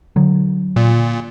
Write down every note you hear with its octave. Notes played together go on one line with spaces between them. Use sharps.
D3 F#3
A#2